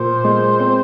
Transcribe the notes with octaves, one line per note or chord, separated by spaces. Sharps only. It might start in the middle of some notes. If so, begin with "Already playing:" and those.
Already playing: A#2 C5
G#3
C4